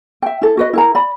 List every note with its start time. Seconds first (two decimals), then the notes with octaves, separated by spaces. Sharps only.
0.22 E5 G5
0.42 E4 A4
0.57 F#4 B4 D#5
0.73 E4 A#4 A#5
0.95 D5 B5